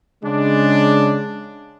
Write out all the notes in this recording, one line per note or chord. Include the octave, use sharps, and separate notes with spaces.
C#3 G#3 D4